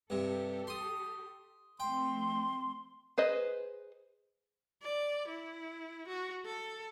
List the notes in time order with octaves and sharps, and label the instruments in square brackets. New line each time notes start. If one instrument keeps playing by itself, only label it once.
[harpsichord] G2 C3 [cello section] G4 A4
[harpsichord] C6 D#6
[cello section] F3 A3 C4 [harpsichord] G5 [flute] C6
[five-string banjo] G#4 B4 C5 D#5
[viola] D5
E4
F#4
A4